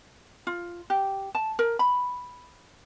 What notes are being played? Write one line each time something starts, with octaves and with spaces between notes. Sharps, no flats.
F4
G4
A5
A#4
B5